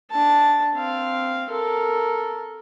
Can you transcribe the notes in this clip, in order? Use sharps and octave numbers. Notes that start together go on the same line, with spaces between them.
D4 A5
C4 F5
A4 A#4